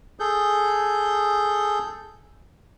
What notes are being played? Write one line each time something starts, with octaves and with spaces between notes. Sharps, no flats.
G#4 A4 G6